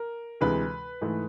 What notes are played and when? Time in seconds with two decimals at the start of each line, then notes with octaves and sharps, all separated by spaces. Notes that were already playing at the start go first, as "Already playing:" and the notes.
Already playing: A#4
0.41 D2 C3 E3 G#3 B4
1.01 G#2 E3 A3